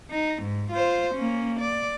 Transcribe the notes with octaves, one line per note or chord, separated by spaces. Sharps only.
D#4
G#2
F4 C5
A#3 C#4
D5